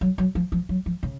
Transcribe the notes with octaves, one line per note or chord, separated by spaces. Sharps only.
F#3
F#3
F3
F3
F#3
F3
C#3